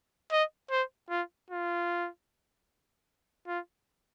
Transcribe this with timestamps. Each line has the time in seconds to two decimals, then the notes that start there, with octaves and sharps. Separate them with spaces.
0.32 D#5
0.71 C5
1.10 F4
1.50 F4
3.47 F4